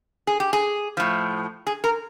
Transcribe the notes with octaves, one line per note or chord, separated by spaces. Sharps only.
G#4
G4
G#4
A2 F3
G#4
A#4